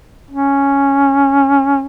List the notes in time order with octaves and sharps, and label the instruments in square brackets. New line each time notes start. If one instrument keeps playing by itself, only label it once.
[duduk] C#4